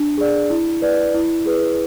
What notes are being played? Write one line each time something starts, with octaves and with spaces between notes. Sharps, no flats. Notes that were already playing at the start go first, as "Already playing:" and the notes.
Already playing: D4
G#4 D5
E4
B4 D5
E4
G#4 B4